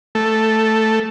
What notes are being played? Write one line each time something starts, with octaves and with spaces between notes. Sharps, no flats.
A3